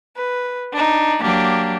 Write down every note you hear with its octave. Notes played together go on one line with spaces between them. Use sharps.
B4
D4 D#4
F#3 A#3 D4 G4